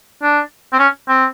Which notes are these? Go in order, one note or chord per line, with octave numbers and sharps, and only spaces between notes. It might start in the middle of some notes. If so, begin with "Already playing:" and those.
D4
C4
C#4
C4